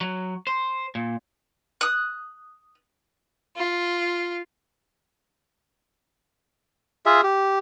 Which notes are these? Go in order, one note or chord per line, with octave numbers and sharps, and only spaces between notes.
F#3
C5
A#2
D#6 F#6
F4
F4 G#4 E5
G4